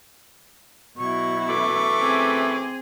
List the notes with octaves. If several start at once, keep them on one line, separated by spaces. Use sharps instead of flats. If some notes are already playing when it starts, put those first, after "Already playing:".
B2 F#3 E4 C#6
F#2 E3 A3 D6
C4 G#4